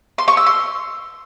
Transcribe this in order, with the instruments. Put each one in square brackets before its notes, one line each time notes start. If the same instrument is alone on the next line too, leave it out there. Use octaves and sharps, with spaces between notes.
[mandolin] C6
C#6
E6
C6